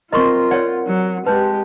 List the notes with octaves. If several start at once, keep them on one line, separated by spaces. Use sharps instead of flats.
C4 F4 A#4 D#5 C6 C#6
C#5 D5 F#5 C#7
F#3
G#3 G4 B4 A5 F#6 G6